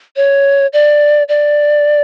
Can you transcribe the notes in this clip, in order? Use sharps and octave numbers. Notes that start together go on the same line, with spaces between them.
C#5
D5
D5